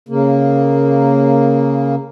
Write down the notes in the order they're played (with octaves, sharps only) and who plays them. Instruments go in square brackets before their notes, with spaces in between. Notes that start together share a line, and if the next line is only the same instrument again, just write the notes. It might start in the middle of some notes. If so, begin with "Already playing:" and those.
[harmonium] C#3 A#3